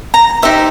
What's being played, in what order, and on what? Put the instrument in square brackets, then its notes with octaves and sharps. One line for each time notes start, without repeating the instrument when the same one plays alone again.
[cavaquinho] A#5
D#4 G4 C5 E5